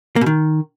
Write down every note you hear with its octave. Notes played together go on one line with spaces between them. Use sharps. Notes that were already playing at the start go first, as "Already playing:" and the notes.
A#3
B2
D#3